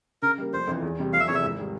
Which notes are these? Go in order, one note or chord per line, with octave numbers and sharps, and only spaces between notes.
C#3 A#4
G3 A#3
F1 C5
F2 E3
E2
C3 G3
F1 F5
E5
E2 C3 E3 C#5
E5
G#1
G3